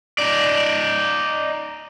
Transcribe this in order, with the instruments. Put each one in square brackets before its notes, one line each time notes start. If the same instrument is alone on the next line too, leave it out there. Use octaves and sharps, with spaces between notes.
[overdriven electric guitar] D#4 D5